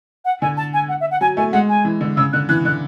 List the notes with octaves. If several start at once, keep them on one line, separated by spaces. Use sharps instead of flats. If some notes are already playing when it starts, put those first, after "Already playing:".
F#5
D3 G#5
A5
G#5
F#5
E5
F#5
F#3 G#5
A3 G#5
G#3 F#5
G#5
E3
D3
C#3 E6
D3 F#6
E3 F#6
D3 F#6